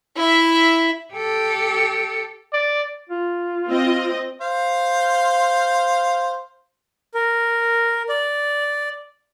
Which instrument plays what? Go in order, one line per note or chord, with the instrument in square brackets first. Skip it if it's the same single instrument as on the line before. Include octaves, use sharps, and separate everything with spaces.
[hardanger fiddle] E4 E5
[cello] G4 A4
[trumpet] D5
[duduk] F4
[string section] C4 D#5
[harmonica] C5 F5
[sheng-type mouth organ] A#4
D5